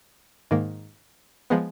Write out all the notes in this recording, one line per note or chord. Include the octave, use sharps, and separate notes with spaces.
G#2 D#3 A#3
F3 G#3 B3